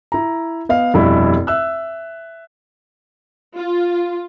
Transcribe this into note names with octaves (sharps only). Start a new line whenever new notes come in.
E4 A#5
B3 D#5 F5
F1 G2 B2 E4 B5
E5 E6 F#6
F4